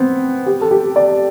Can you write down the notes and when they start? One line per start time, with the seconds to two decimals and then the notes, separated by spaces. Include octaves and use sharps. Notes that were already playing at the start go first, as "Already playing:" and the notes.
Already playing: B3 C4
0.46 G4
0.61 A4
0.71 G4
0.96 D5